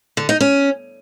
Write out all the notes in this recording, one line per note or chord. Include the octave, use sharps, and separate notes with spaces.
D3
D#4
C#4